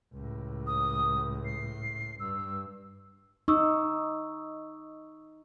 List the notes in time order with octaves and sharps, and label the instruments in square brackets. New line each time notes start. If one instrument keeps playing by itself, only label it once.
[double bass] C#2 A2
[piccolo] D#6
C7
[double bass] G2 [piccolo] E6
[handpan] D#4 [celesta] C#6 D#6 E6